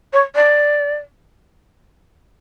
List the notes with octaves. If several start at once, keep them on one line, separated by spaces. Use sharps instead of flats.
C#5
D5